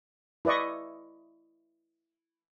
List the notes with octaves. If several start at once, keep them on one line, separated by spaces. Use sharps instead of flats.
E4 B4 D5 D#5 C#6